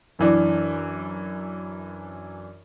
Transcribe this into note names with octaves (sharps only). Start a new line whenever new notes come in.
F#2 E3 D4